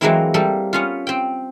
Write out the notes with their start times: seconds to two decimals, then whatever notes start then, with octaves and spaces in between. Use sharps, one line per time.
0.01 E3 F#3 G#3 A#3 C4 E4
0.34 G3 A#3 A4
0.73 B3 C#4 F4
1.07 C4 G5